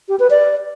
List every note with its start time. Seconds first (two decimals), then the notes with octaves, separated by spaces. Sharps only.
0.09 G4
0.19 B4
0.30 D5